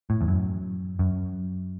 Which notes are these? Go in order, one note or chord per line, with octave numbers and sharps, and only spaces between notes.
A2
E2
F#2
F#2